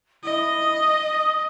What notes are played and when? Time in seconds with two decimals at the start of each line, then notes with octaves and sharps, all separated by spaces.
0.23 E4 D#5
0.62 D#6